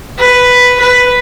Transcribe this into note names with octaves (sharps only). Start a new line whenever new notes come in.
B4
B4